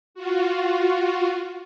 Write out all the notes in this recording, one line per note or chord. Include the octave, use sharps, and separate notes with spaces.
F4 F#4